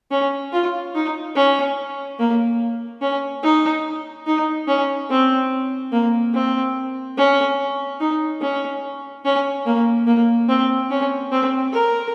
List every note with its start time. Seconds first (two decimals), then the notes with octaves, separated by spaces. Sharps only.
0.11 C#4
0.52 F4
0.95 D#4
1.35 C#4
2.19 A#3
3.01 C#4
3.43 D#4
4.26 D#4
4.67 C#4
5.10 C4
5.92 A#3
6.34 C4
7.17 C#4
8.00 D#4
8.41 C#4
9.25 C#4
9.65 A#3
10.07 A#3
10.49 C4
10.90 C#4
11.32 C4
11.73 A#4